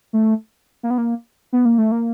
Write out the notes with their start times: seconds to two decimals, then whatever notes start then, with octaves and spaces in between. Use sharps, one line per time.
0.13 A3
0.83 A#3
0.90 B3
0.98 A#3
1.53 B3
1.65 A#3
1.78 A3
1.92 A#3